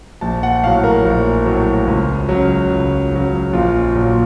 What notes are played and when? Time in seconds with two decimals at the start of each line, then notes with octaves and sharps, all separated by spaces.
0.21 A#1 A5
0.43 F#5
0.63 A2 F#3 F5
0.84 A#4
1.05 A#1
1.46 A2 F#3
1.87 C#2
2.29 C#3 F#3
2.70 C#2
3.12 C#3 F#3
3.53 A#1 F4
3.95 A#2 F#3